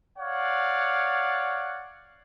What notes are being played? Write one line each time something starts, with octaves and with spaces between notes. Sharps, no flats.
C#5 D5 F5 F#5